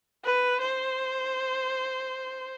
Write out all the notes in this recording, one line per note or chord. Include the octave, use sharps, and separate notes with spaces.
B4
C5